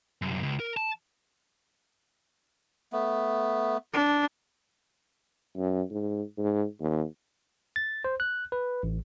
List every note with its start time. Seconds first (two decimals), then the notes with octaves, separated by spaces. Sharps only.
0.22 C2 F#2
0.43 C#2
0.60 A#4
0.77 A5
2.93 A3 B3
3.93 D4
5.56 F#2
5.90 G#2
6.37 G#2
6.80 D#2
7.76 A6
8.05 C5
8.20 F#6
8.52 B4
8.83 A1